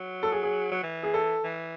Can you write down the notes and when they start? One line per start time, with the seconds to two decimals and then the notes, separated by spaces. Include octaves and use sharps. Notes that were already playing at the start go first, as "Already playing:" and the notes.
Already playing: F#3
0.23 A4
0.32 G#4
0.43 G#4
0.72 F#3
0.83 E3
1.03 G#4
1.14 A4
1.44 E3